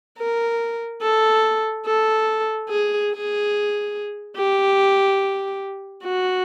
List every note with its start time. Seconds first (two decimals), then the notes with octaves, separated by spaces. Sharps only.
0.18 A#4
1.02 A4
1.86 A4
2.69 G#4
3.11 G#4
4.37 G4
6.04 F#4